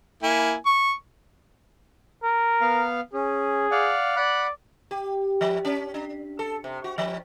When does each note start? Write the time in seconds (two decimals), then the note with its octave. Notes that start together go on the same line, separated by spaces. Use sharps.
0.23 A#3 E4 G#5
0.66 C#6
2.23 A#4
2.61 B3 F5
3.13 C#4 G#4
3.71 D5 F5 F#5
4.16 D5 F#5 B5 F#6
4.91 G4
5.41 F3
5.65 C#4
5.94 D4
6.39 A4
6.64 C3
6.84 F#4
6.98 F3